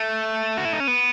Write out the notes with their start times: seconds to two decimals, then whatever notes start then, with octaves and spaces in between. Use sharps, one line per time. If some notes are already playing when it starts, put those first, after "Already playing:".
Already playing: A3
0.57 F#4
0.65 E4
0.73 D#4
0.80 C#4
0.88 B3